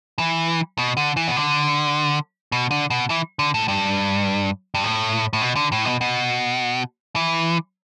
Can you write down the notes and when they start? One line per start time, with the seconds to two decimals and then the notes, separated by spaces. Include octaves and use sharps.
0.19 E3
0.78 B2
0.97 D3
1.17 E3
1.28 B2
1.36 D3
2.52 B2
2.71 D3
2.90 B2
3.10 E3
3.39 D3
3.54 A2
3.68 G2
4.74 G2
4.84 A2
5.33 A2
5.42 B2
5.56 D3
5.72 A2
5.85 B2
6.01 B2
7.16 E3